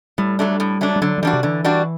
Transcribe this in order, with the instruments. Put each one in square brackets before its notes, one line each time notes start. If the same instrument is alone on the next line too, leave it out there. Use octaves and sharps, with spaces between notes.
[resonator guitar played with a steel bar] A2 [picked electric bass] G3
[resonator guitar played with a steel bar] F#3 A3 D4
A2
F#3 A3 D4
[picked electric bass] G3
[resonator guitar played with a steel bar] D3 [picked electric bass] F#3
[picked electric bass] F#3
[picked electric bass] E3 [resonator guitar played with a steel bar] G3 D4 F#4
[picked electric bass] C3
[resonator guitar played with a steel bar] D3 [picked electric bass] E3
[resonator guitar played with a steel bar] G3 D4 F#4